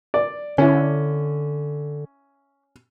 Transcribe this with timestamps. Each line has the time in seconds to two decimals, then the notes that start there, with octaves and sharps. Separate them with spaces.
0.14 D5
0.58 D3 C#4 E4